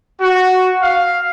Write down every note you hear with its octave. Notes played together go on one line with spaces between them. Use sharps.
F#4
F5